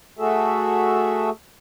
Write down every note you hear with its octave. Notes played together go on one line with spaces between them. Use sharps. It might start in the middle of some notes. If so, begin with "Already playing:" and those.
A3 F#4 G#4 A4 E5